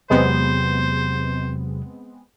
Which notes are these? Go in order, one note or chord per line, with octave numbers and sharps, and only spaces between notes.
E2 C3 F#3 G#3 B3 C4 C5